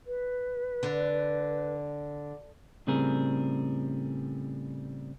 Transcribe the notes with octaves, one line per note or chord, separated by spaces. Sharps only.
B4
D3
A2 C#3 G3 C4 G#4 A#4